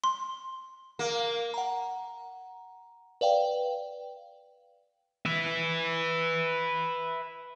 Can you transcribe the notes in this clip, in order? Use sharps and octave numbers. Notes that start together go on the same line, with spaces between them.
C6
A#3
F#5 A#5
B4 D5 F5 G5
B4 E5